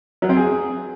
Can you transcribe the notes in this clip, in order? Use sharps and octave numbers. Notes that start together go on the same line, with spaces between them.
F#3
C4
G#4